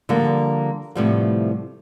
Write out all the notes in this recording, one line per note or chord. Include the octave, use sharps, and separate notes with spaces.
D3 F3 G3 A#3
A2 C3 F3 G3 A3 B3